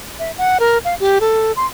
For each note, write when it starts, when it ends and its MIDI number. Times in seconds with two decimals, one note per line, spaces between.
0.19 0.31 76
0.38 0.58 78
0.60 0.78 70
0.85 0.95 77
1.00 1.19 67
1.21 1.52 69
1.56 1.66 84